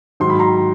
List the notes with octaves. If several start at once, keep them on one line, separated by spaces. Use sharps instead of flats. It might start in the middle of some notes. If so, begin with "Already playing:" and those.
G#2 D#3 F#3 C6
B5
A#5 C6